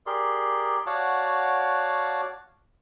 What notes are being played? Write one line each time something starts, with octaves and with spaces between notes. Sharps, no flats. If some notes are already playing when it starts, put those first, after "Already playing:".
G4 G#4 A#4 D5 C6
F#4 C#5 D5 F5 F#5 A5